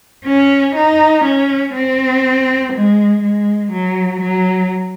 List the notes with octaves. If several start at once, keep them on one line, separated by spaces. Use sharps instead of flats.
C#4
D#4
C#4
C4
G#3
G#3
F#3
F#3